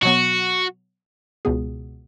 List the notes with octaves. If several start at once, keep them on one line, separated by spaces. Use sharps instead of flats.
B2 F#3 B3 F#4
C#2 B2 B3 G#4